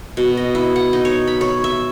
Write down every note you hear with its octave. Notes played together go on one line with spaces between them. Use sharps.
B2
D#5
E4
F#5
D#4
C#5
B5
C#5
E5